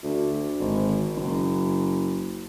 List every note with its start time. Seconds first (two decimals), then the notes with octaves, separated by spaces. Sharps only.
0.03 D2
0.59 G#1
1.16 F#1